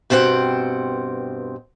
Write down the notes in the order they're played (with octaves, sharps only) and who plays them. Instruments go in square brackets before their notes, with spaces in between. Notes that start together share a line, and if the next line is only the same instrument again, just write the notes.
[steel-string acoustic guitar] G2 B2 C4 C#4 F#5 G5